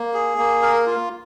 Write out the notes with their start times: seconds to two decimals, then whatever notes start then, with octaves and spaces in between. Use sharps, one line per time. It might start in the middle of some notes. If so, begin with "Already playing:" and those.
Already playing: A#3
0.14 G#4
0.38 A#3
0.62 A#4
0.86 F4